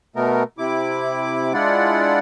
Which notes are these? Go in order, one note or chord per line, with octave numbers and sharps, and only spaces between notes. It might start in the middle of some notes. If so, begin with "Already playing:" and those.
B2 A3 B3 A#4
C3 E4 D6
G#3 D4 E4 F4 D5 F#5